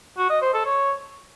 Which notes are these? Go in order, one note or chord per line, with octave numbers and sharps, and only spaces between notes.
F#4
D#5
C5
A4
C#5